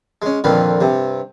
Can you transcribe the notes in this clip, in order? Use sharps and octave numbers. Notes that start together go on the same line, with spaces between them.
G#3 C#4
F2 A#2 D3 D#3 B4 F5
G2 C3